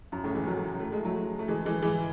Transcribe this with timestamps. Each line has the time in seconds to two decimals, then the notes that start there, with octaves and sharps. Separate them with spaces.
0.12 F#2
0.24 A2 C#3
0.35 E3 G#3
0.47 F#3 A3
0.80 A3
0.93 G#3
1.05 F#3 A3
1.39 A3
1.48 E3 G#3
1.65 E3 G#3
1.82 E3 G#3